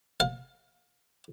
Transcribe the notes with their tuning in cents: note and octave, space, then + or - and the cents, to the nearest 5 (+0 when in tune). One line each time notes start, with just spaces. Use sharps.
F5 +35